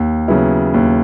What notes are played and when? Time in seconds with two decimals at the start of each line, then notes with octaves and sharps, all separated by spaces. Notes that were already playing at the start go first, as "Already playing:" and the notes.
Already playing: D#2
0.28 C#3 F#3 B3 E4
0.74 D#2